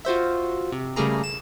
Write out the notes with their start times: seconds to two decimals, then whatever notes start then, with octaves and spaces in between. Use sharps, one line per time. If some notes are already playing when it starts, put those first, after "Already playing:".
0.05 F4 F#4 C5 E5
0.72 C3
0.96 C#3 G3 A3 A#3 G#4 A#5
1.24 E7